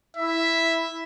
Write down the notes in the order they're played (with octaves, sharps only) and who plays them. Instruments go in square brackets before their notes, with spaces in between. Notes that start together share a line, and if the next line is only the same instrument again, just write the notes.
[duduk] E4 [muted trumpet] E5